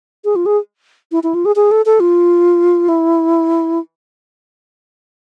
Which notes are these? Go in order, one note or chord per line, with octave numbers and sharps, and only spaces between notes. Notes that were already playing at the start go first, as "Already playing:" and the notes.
G#4
F4
G#4
E4
E4
F4
G#4
G#4
A4
A4
F4
E4